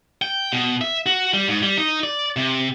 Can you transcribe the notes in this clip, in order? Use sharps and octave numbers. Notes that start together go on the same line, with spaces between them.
G5
B2
E5
F#4
G3
G#2
G3
D#4
D5
C3